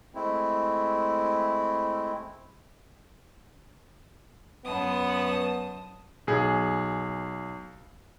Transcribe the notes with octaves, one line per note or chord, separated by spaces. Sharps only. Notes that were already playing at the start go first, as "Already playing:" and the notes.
G#3 A3 C4 E4
F#2 B3 A5 D#6
B1 G#4